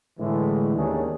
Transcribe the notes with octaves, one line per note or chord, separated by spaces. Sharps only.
A2 D3 E3 G#3
D#2 D#3 C#4 D4 G#4